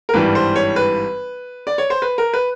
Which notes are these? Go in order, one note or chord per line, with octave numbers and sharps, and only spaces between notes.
A#4
G#1 G2 E3 G3 B4
C5
C#5
B4
D5
C#5
C5
B4
A#4
B4